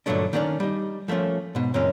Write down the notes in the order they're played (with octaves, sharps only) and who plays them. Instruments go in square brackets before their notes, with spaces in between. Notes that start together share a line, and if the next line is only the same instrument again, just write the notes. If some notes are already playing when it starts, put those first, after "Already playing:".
[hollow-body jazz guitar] G2 A#2 D3 F#3 A3 D4
D#3 A#3 C#4 D4 C5 D5
G3 D#4
F3 A3 A#3 C#4 F4
G#2 B2
C#2 F#2 A#2 G#3 C4 C#4